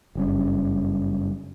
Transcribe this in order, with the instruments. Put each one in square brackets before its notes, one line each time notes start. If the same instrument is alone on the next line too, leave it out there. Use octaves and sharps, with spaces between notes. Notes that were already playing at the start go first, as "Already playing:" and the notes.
[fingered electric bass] F#1 G2 C#4